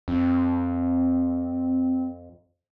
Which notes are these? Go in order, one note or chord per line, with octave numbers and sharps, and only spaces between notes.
F2 C4